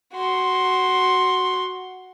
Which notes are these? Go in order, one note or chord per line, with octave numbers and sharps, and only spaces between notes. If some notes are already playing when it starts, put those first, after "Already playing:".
F#4 C6